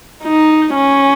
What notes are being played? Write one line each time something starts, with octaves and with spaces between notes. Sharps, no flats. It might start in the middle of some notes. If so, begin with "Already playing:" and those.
D#4
C#4